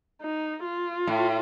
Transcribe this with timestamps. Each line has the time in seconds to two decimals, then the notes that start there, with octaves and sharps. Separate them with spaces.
0.21 D#4
0.64 F4
1.07 A2